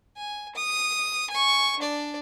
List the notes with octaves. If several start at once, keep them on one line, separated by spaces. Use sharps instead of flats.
G#5
D#6
G#5 C#6
D4 D5